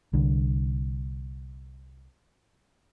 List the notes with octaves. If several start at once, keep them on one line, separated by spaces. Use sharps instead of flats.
C2 D3